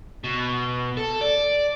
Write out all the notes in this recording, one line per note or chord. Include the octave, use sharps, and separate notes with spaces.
B2
A4
D5